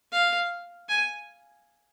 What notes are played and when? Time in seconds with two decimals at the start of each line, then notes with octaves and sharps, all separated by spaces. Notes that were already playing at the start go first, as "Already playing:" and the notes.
0.12 F5
0.89 G#5